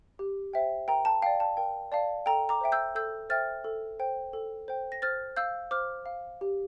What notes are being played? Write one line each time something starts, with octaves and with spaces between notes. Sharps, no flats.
G4
C5 E5 G5
A#4 G5 A#5
A5
D5 F5 G5
A5
A#4 G5
D5 F5 A5
A4 G5 A#5
A#5 D6
C5 E5 G5
E6 G6
A4 E6 G6
C5 E5 G5 F6 A6
A4
C5 G5
A4
C5 G5
A#6
C5 F6 A6
F5 E6 G6
C5 D6 F6
F5
G4